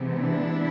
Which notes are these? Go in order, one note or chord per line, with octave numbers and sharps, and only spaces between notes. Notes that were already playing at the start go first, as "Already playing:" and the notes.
Already playing: C3 E3 G#3 B3
D4 E4